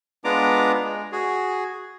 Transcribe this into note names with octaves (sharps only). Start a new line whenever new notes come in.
G#3 B3 D4 F4 A#5 D6
G#3
F#4 G#4